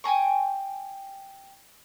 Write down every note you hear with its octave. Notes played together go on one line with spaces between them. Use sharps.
G5 G#5 A#5 C#6